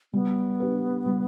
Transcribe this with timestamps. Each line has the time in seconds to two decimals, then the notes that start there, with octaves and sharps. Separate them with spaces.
0.13 G3 B3
0.60 D4 G4 B4
1.06 G3